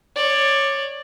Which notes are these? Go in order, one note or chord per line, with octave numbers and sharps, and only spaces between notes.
C#5 D5